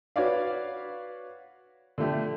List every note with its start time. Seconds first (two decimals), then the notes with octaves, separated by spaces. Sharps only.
0.16 F#4 B4 C#5 D5 F5
1.98 D3 F3 A3 G4